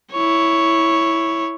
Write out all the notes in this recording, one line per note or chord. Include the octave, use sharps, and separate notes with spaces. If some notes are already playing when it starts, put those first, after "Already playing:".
E4 C#5